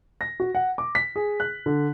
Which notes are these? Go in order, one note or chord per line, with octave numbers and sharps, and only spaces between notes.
A#6
F#4
F#5
D6
B6
G#4
F#6
D3